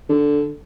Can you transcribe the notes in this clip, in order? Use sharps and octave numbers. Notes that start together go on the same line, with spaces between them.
D3